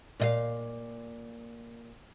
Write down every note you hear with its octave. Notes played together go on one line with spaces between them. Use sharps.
A#2 D#5 F5